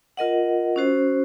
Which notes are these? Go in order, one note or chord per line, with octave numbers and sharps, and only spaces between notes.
F4 A#4 D#5 F#5
C#4 F#4 C5